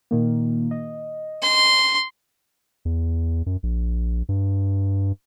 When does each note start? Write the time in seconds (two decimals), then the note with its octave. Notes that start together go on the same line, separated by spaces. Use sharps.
0.11 A#2 D#3 A#3
0.71 D#5
1.43 C6
2.85 E2
3.46 F#2
3.63 A#1
4.29 G2